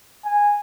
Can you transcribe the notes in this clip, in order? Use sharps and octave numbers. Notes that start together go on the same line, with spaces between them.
G#5